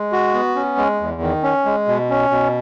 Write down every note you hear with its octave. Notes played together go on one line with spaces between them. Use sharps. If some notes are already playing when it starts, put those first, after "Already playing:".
Already playing: G#3
F#4
B3
C#4
G#3
E2
D#3
C#4
G#3
B2
C#4
B2